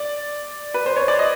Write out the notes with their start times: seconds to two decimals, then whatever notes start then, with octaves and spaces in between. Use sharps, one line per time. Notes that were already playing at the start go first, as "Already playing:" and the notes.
Already playing: D5
0.74 B4
0.86 C5
0.96 C#5
1.08 D5
1.19 D#5